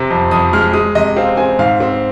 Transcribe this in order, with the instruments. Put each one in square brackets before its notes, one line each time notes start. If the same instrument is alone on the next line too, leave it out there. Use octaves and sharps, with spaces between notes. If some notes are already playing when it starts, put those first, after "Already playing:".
Already playing: [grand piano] C3 C4
F2
F2 D#6
G#3 F6
G#3 D#6
C3 D#5
C4 F5
C4 G#5
G#2 F5
C4